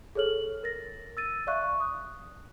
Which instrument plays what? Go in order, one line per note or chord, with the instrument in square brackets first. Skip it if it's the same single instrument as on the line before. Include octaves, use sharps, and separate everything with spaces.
[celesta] G#4 A4 C#5 F6 F#7
A#4 A6 A#6
E6 A6 D#7
D5 E5 F5 C#6 F#6
C#6
D#6 F#6